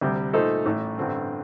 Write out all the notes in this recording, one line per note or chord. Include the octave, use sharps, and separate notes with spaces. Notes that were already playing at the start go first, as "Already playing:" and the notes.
D2 C3 G3
A#2 A3 D#4 A4 C5
A1 A2 A3
A1 G2 D3 A3 C4